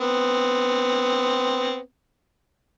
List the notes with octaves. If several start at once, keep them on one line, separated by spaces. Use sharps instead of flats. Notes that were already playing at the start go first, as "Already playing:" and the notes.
B3 C4